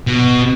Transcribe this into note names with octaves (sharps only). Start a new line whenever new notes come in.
B2